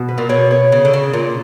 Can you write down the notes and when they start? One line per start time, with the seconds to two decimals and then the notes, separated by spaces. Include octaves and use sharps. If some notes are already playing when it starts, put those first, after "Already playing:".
Already playing: B2
0.08 B4
0.18 A#2
0.29 B2 C#5
0.51 C#5
0.72 C#3
0.85 D3
0.93 C#3
1.13 A#2